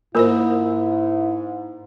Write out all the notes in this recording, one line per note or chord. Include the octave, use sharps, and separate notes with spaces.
G#2 A#3 E4 F4 A4 A#4 C5 B5